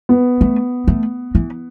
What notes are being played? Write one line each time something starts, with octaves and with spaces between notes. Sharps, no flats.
B3
A3
A3
E3